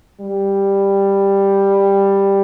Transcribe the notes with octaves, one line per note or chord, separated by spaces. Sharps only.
G3